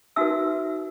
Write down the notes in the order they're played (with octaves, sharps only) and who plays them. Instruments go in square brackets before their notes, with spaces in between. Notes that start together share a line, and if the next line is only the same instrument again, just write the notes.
[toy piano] D#4 F#4 B4 E5 E6